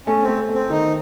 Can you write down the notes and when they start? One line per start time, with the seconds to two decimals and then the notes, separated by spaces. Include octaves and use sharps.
0.07 A3 C#4
0.23 C4
0.28 A3
0.49 A3
0.55 C4
0.70 D#3 D#4